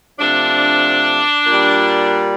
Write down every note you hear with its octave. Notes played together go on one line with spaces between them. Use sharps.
C3 F3 A3 D4
A#2 G3